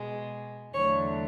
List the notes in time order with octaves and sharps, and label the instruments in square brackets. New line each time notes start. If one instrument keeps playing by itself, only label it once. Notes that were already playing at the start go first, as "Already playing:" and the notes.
Already playing: [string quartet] B2 G#3
E2 D3 F#3 A3 C#5